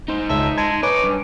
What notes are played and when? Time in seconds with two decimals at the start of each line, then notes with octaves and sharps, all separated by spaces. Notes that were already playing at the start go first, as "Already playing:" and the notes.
0.08 D#4 C5
0.30 C#2 E5 A5
0.58 G#3 A5 G#6
0.83 D#4 B4 C#5 G#5 D6
1.04 G2